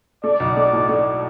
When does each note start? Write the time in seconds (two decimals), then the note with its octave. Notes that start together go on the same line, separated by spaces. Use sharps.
0.23 A3 D5
0.40 B1
0.57 A3
0.73 A2
0.88 A3 D5